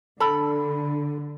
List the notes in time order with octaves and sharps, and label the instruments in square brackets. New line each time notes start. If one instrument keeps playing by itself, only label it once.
[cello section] D3 [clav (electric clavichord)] A4 [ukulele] B5